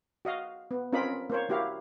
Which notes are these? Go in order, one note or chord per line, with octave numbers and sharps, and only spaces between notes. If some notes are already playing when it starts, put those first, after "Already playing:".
F#4 D#5 F5
B3
C4 C#4 F4 A#4 D#5 B5
A#3 C5 C#5
A#3 E4 F#4 G4 F5